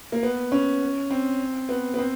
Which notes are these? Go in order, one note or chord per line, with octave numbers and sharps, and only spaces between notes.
A#3
B3
C#4
C4
B3
B3
C4